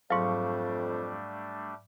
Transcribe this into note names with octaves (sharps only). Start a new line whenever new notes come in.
F2 G#2 F#3 G3 A3 D4 F5 C#6